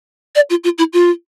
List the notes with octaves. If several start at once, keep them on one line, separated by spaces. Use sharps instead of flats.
D5
F4
F4
E4
F4